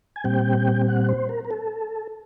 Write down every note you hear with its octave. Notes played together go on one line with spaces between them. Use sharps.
G#5
A#2 G3 C4 G5
F#5
C5
A#4
A#4
A4